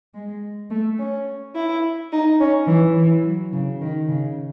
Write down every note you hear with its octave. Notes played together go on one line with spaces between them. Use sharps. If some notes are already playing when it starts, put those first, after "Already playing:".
G#3
A3
C#4
E4
D#4
C#4
E3
E3
F#3
C#3
D#3
C#3